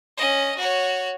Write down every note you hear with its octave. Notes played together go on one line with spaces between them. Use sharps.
C#4 D#5
F#4 C#5